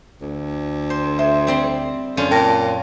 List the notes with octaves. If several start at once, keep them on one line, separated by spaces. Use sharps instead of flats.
D2
C5
C5 E5
G3 C4 C6
F#2 D3 C#4 F4
A#2 G5 A5 A#6